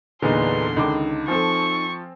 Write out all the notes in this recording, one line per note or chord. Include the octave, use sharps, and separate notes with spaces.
E2 A#2 D3 D#4 G#4 B4 A#5 C6
C#2 D3 D#3 D#4 D6
F3 C4 A4 G#5 C#6